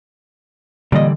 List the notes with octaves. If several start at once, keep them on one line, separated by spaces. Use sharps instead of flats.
A#2 D3 E3 G3 D#5